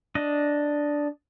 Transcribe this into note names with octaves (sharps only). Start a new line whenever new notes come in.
D4 D#5